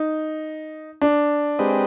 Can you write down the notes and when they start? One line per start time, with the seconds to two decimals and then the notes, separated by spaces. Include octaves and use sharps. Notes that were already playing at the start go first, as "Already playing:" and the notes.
Already playing: D#4
1.02 D4
1.59 G#3 C4 G4 B4 D#5